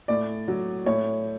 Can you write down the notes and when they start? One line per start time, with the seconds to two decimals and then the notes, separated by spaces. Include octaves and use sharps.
0.08 A2 D5
0.48 F#3
0.86 A2 C#5